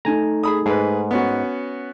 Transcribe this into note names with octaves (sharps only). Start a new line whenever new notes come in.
A3 D#4 G#5 A#5
G#4 B5 D#6
G#2 G#4 B4
B3 C#4 F#4